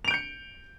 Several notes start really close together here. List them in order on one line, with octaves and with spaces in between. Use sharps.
F7 D7 G6 C#7